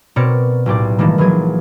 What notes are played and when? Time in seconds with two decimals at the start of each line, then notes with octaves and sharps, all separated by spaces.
0.16 B2 C4 A#4 C#5 D5 C#7
0.66 B1 A2 G4 D5
0.98 D#3 E3 G3 G#3 A#3 A4
1.18 A#1 E3 F#3 G#4 G#6